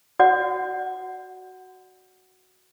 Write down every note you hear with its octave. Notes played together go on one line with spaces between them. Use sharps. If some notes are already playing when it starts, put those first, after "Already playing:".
F#4 D5 F#5